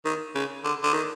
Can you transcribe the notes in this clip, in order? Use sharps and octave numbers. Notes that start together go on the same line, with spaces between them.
D#3
C#3
D3
D3
D#3